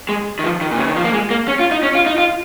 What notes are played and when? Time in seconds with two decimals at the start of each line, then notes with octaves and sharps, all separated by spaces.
0.09 G#3
0.39 D#3
0.44 F3
0.61 D#3
0.71 A#2
0.78 C#3
0.87 D#3
0.96 F3
1.04 A#3
1.13 G#3
1.31 A#3
1.48 C#4
1.59 F4
1.71 D#4
1.83 C#4
1.95 F4
2.06 D#4
2.18 F4